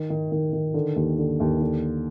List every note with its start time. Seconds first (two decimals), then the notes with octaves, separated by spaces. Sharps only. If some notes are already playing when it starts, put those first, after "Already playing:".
Already playing: D#3
0.10 D#3
0.32 D#3
0.53 D#3
0.74 D3
0.96 D#2
1.18 D3
1.40 D#2
1.60 D3